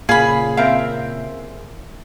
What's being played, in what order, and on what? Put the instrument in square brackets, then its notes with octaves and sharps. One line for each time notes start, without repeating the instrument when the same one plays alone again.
[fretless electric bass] A#2 C#3 [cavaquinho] G#4 B5 [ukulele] F5
[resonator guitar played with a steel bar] C4 A#4 E5 [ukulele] F5